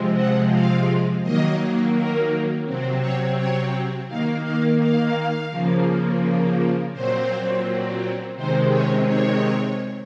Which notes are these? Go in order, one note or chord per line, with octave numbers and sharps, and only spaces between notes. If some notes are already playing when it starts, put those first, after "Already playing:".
Already playing: C3 F3 G#3 C4
F#5
F5
D#3 F#3 A#3 D#5
A#4
C3 F#3 C4
C#5
C#5
D#3 A#3 F5
F5
F5
C#3 F3 A#3
A#2 F#3 C4 C5
C3 D#3 G#3 C4 C5
C#5
C#5